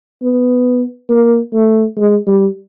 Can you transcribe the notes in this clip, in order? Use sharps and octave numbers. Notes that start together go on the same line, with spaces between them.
B3
A#3
A3
G#3
G3